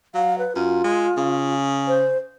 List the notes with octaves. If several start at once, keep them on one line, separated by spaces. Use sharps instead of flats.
F#3 F5
B4
F#2 F4
G#3
C#3
C5